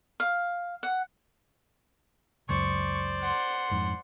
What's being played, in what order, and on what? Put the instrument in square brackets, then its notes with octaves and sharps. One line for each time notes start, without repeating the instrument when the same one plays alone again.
[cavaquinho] F5
F#5
[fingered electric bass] C#2 F#2 [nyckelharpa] C5 D5 [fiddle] C#6
[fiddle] F#5 C6
[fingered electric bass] F2 G#2